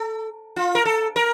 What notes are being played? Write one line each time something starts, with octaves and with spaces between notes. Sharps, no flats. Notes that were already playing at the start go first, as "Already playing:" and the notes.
Already playing: A4
F4
A#4
A4
A#4